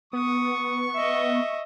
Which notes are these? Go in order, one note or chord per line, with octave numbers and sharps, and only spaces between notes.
B3 C#6 D#6
D#5 E5